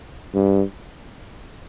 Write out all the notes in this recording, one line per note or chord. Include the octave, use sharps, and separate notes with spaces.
G2